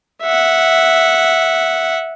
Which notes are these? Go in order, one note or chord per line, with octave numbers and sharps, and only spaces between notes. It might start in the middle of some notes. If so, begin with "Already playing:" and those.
E5 F#5